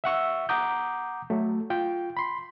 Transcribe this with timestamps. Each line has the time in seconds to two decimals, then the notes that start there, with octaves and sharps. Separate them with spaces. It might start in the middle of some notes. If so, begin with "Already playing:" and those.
0.04 E5 F#5 C#6 E6
0.49 F#5 A#5 D6 D#6 G6
1.30 F#3 A3
1.70 F4 G5
2.17 B5 C6